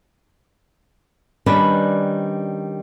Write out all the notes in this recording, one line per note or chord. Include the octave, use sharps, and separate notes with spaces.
D#3 G3 C#4 D4 B4